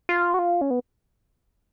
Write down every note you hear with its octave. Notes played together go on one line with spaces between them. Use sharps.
F4
F#4
F4
C#4
B3